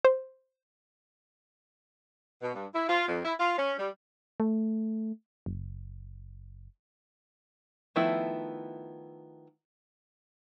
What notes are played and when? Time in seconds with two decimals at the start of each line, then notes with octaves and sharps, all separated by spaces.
0.05 C5
2.41 B2
2.54 G2
2.74 E4
2.88 F4
3.08 F2
3.24 E4
3.39 F4
3.57 C#4
3.79 G3
4.40 A3
5.46 F#1
7.96 D#3 F3 A3 B3 E4